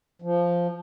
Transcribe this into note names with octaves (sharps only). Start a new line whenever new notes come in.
F3